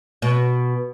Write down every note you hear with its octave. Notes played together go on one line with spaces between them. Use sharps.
B2